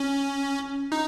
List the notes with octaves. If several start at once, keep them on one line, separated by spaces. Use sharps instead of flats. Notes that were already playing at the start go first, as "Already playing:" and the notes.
Already playing: C#4
D#4